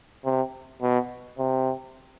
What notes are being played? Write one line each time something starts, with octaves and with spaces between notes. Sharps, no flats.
C3
B2
C3